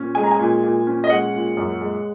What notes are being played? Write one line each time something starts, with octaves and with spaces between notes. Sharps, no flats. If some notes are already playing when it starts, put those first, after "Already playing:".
Already playing: A#2 C#4
G#3 G#5
A#5
G#5
A#2
A#2
C#4
D#5
G#3 F#5
A#2
F#2
G#3